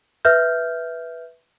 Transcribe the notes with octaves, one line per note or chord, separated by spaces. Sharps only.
B4 E5 F6 G6